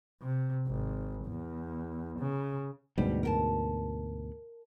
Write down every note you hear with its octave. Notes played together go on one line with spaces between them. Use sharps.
C3
G#1
E2
C#3
D2 G#2 B2 G3
A#4 G5 A5